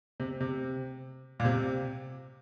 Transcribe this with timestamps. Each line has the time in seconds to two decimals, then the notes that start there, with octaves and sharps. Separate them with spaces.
0.20 C3
0.40 C3
1.40 A#2
1.45 C3